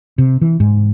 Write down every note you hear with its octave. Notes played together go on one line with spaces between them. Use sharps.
C3
E3
G#2